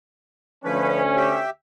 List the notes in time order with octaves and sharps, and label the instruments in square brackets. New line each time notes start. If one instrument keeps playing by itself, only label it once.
[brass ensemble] D2 C#4 [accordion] F3 B4
[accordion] G4 E5